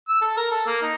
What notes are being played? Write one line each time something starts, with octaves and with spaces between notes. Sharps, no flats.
E6
A4
A#4
A4
A#3
D#4